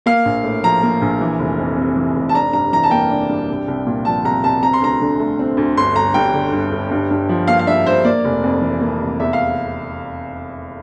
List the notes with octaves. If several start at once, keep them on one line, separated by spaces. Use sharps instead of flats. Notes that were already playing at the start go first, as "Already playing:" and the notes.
A#3 F5
A#1
A2
F3 A#5
A#3
A#1
E3
F1
F2
C3
E3
F1
A5
D4 A#5
G2 A#5
E3 A#5
A5
A#3 G5
D4
G2
C2
C2
A#2
F3 A5
C2 A#5
C2 A5
C4 A#5
C6
D2 A#5
D3
A3
C4
D2
G1 C6
G1 A#5
G2 G5
D3
G1
G1
G2
G2
F3
A#3 F5
F5
G2 E5
G2 C5
A#3 D5
F1
F2
E3
A#3
F1
E2 E5
F5